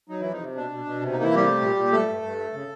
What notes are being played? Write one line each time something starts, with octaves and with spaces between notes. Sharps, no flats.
F#3 D#4
F2 E3 E4
D#4
C3
B2 D4
B2
B2
C3
A#3 D#4
E3 E4
C3 G3 G4
A3
A#2
A#2
G2 A3 A4
G2
G2
A3
C#3